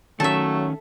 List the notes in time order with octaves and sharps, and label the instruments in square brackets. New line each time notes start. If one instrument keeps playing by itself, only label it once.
[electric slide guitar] D#3 C#4 [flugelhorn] F#3 [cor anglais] A3 [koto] A4 E5